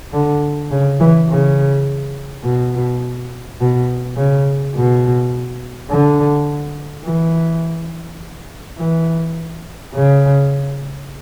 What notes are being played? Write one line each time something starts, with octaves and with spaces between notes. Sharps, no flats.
D3
C#3
E3
C#3
B2
B2
C#3
B2
D3
E3
E3
C#3